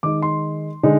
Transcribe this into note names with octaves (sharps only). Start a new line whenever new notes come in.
D#3 G#3 D#4 D6
C6
D3 G#3 D#4